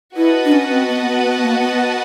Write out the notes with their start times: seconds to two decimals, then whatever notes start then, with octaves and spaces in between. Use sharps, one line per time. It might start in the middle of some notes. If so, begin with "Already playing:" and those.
0.16 E4 F#4 B4 D#5 F#5 A5
0.45 D4
0.52 C#4
0.71 C4
0.89 B3
1.06 B3
1.25 B3
1.43 A#3
1.60 B3